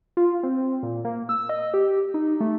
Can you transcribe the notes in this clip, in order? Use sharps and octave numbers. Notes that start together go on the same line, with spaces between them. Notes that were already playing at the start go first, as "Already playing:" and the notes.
F4
C4
A#2
A#3
E6
D#5
G4
D#4
A3